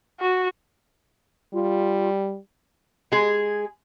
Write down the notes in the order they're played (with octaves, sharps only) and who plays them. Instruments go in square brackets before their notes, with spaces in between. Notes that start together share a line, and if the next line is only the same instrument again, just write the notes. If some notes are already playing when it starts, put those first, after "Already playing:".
[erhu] F#4
[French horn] G3 [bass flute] F4
[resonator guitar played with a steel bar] G#3 G#4